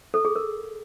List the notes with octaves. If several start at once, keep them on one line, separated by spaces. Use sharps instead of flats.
A4
G#4
A#4